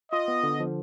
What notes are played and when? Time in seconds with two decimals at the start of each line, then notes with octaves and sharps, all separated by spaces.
0.12 F4 D#5
0.28 B3
0.43 D3
0.60 F3